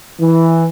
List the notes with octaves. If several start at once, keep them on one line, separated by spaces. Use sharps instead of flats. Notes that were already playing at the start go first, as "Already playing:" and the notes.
E3